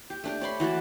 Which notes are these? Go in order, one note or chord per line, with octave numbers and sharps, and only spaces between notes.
G4
A3 D4 G4
C#5 D5 B5 C6
E3 F#4 B4 A5